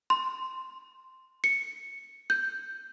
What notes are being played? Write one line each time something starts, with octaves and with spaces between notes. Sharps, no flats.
C6
C#7
G6